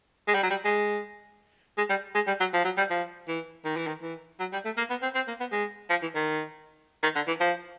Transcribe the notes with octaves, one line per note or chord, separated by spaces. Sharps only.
G#3
G3
F#3
G3
G#3
G#3
G3
G#3
G3
F#3
F3
F#3
G3
F3
E3
D#3
E3
D#3
E3
F#3
G3
A3
A#3
B3
C4
C4
A#3
B3
G#3
F3
E3
D#3
D#3
D3
E3
F3